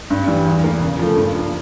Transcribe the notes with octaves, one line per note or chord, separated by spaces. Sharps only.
G2
E3 G3
E2
E3 A#3
C#3
F3 A3
G2
F3 A#3